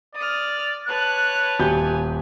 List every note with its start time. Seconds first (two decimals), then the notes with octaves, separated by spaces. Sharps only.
0.15 D5 D#6 F6
0.87 B4 C#5 A5 F#6
1.60 D#1 G4 G#5 G6